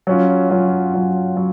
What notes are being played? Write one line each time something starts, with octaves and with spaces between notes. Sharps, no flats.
F#3 C#4 F4
F#3 C#4 F4
F#3 C#4 F4
F#3